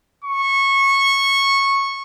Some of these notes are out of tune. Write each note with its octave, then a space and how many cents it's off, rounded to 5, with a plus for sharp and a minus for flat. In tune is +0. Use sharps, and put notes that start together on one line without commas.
C#6 -15